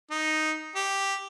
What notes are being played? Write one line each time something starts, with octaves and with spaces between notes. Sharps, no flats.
D#4
G4